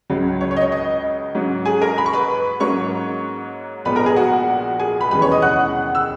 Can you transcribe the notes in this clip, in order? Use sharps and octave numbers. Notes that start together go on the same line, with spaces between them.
C#2 C#3 F#3
C#5
C#5
D#5
C#5
D#5
G#2 F#3 C#4
G#4 G#5
A#4 A#5
B5
C#6
B4 B5
G#2 F#3 A#3 C#4 C#5 C#6
A#1 A#2 G#3 B3 B4 B5
A#4 A#5
G#4 G#5
F#4 F#5
G#4 G#5
B4 B5
E1 D#2 C#3 E3 G#3 B4 B5
C#5 C#6
D#5 D#6
F#5 F#6
E6